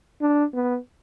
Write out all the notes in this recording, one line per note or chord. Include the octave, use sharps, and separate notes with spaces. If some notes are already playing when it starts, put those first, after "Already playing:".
D4
B3